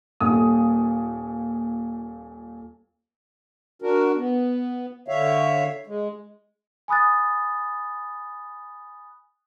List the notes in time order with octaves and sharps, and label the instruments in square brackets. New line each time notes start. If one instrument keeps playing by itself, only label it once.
[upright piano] D#1 A#2 D#6
[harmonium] D4 F#4 A#4
B3
D3 C#5 E5 F5
G#3
[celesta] G#5 B5 D#6 F#6 A6